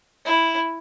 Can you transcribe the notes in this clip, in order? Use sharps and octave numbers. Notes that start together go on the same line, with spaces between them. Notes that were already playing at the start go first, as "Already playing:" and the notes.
E4